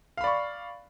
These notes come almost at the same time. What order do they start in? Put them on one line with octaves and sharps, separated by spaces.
F5 B5 D5 C#6